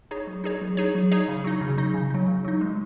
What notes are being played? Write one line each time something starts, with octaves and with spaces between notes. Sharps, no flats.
D#4 G#4 C#5
F#3
D#4 G#4 C#5
F#3
D#4 G#4 C#5
F#3
D#4 G#4 C#5
C#3
F#3 D#4
C#3
F#3 D#4
C#3
F#3 D#4
C#3
F#3 D#4
G#3